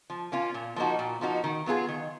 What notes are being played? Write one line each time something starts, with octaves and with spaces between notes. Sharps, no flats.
F3
A#3 C#4 F4
A#2
F3 A#3 D#4 F#4
A#2
F3 A#3 D#4 F#4
D#3
F#3 B3 F4 G#4
D#3